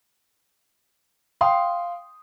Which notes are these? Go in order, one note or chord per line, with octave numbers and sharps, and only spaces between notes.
F5 G5 C6 D#6